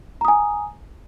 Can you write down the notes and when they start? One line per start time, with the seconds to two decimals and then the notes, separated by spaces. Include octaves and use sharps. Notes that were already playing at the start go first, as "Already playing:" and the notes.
0.21 A#5
0.25 D#6
0.28 G#5